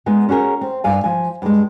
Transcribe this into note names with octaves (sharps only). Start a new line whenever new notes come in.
G#3 B3 D#4 G#4
C#4 F#4 G#4 A#4
C4
G2 F5 G#5
F3 G#5
G2 G#3